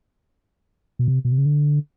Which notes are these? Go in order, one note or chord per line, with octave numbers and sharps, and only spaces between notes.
B2
C3
B2
C3
C#3
D3